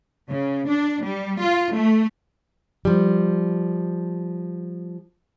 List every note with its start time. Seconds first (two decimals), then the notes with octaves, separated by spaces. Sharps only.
0.30 C#3
0.69 D4
1.04 G3
1.41 F4
1.75 A3
2.85 F3 G3